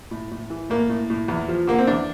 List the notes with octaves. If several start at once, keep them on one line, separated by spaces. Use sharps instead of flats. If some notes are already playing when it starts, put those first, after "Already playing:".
A2
A2
E3
A2 A#3
A2
A2
E2
F3
D3 A#3
C4
E2 D4